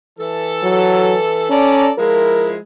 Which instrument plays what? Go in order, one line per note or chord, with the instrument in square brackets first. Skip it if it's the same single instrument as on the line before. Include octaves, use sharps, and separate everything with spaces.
[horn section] E3 A4
[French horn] F#3
[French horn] C#4 [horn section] A4 D5 A#5
[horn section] F3 G#3 E4 [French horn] A#4